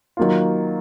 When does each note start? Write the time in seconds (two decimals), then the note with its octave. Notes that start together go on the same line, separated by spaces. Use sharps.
0.17 D#3 F#3 A#3 F4